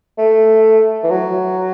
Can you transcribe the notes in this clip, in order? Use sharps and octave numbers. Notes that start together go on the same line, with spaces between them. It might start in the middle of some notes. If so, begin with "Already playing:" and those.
A3
E3
F#3